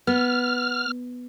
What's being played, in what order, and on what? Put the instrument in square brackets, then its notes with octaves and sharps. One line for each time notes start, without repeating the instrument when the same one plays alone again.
[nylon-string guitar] B3 [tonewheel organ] F6